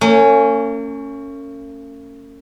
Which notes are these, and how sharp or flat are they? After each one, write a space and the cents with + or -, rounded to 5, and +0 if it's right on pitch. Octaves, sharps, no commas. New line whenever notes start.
A#3 -45 C#4 +0